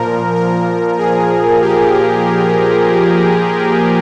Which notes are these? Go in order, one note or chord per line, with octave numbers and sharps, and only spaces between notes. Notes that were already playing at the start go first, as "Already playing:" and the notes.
Already playing: A#2 F3 A#4
A#4
G#4
G4